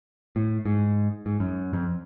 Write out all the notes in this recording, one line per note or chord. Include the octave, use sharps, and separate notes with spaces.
A2
G#2
G#2
F#2
F2